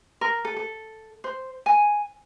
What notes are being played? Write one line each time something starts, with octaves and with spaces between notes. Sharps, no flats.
A#4
A4
A4
C5
G#5